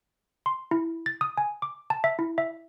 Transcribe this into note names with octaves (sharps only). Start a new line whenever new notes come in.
C6
E4
A6
D#6
G#5
D6
A5
E5
E4
E5